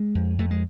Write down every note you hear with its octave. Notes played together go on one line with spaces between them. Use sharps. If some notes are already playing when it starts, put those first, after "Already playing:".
Already playing: G#3
F2
F2 A3
G#3